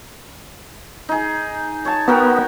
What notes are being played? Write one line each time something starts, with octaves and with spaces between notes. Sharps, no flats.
D#4 G#4
C#5 A5
B3 F#4 A#4 G5